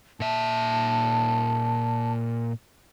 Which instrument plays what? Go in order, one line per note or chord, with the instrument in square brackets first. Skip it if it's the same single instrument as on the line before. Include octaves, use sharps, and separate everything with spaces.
[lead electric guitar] A#2 E5 [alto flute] A5